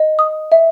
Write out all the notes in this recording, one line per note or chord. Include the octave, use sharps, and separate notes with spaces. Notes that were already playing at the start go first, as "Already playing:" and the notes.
Already playing: D#5
D#6
E5